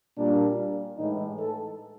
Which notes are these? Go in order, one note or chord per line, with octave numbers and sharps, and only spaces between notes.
A#2 G3 A#3 D4
A2 E3 G#3 D#4
A4